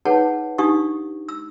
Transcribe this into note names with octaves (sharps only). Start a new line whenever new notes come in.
D#4 G#4 B4 C#5 F#5 A5
D4 D#4 G4 F5 C#6 D#6
E6